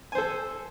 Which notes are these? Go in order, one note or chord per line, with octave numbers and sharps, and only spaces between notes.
A4 C5 G#5